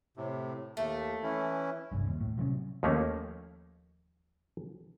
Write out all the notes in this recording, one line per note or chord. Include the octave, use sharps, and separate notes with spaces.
A2 C3
D#2 A3
E3 C#4 E4
G1 C2 G2
D#2
A2
C3 F#3 A3 C#4
D#2 F3 A3 A#3 C#4